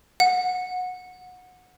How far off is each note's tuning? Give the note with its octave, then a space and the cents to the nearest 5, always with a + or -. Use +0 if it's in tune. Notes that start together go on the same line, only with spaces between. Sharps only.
F#5 -20